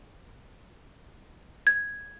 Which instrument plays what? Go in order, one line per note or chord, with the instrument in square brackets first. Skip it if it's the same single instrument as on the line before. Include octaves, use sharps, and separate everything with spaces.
[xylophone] G#6